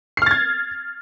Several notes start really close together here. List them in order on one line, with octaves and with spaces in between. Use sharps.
C7 F6 A6 G#6